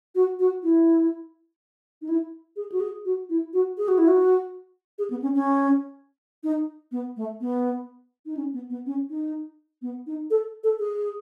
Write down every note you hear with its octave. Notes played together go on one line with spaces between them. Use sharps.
F#4
F#4
E4
D#4
E4
G#4
F#4
G#4
F#4
E4
F#4
G#4
F#4
E4
F#4
G#4
B3
C#4
C#4
D#4
B3
A3
B3
D#4
C#4
B3
B3
C#4
D#4
B3
D#4
A4
A4
G#4